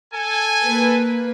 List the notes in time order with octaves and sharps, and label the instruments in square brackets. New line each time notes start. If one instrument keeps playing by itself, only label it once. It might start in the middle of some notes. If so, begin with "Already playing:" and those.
[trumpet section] A4 G#5
[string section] A#3 B4